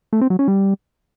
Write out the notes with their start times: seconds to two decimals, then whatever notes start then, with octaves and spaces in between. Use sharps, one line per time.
0.13 A3
0.21 C4
0.30 F#3
0.39 C#4
0.48 G3